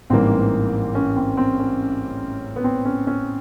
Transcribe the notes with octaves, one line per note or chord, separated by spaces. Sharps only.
A1 G#2 E3 G3 A#3 C4
C#4
C4
C4
C#4
B3
C4
C#4
C#4